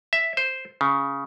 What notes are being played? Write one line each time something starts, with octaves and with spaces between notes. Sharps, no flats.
E5
C5
C#3